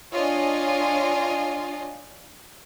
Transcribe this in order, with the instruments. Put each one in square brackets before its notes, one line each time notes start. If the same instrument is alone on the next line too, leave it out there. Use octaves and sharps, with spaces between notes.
[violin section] D4 F4 C#5 D#5 G#5